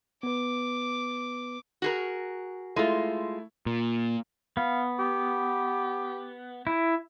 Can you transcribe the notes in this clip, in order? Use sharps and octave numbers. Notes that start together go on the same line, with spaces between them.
B3 B4 D6
F#4 G#4 A#4
G#3 A3 E4 F4
A#2
B3 F5
G4
E4